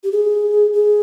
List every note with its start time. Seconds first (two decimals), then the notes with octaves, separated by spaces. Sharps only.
0.04 G4
0.12 G#4
0.73 G#4